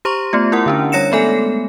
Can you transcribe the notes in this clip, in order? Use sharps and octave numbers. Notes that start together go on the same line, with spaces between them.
G4 C5 A#5 C6 C#6
A3 B3 F4
E4 A#4 F#5
D3 C#4 D4
G3 C#5 A#6 C#7 E7
G#3 A3 B3 A4 G#5